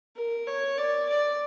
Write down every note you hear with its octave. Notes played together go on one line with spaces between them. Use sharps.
A#4
C#5
D5
D5